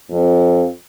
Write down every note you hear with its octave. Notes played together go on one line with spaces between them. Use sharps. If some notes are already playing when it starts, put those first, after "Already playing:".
F2